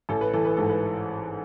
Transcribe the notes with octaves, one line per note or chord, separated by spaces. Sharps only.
A1 A4
B4
E3 A4
B4
G#2 A4
B4